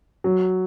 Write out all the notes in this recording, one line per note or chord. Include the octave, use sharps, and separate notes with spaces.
F#3